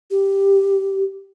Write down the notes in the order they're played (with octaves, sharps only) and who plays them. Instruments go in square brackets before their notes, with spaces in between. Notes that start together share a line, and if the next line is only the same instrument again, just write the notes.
[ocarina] G4